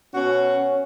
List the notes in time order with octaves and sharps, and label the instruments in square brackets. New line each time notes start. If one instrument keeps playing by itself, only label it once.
[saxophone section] B2 F#4 [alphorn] C#4